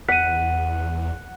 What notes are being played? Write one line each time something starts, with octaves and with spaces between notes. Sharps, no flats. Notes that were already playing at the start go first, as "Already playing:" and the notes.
E2 F#5 B6 D#7